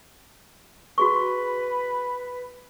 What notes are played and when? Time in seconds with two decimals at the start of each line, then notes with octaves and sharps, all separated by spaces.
0.98 F#4 G#4 B4 C#6